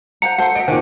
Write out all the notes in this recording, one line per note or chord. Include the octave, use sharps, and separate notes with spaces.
C5 F#5 A#5 C#7
A4 C5 F#5
D#5 E5 D7
A#2 D#3 C5 G#5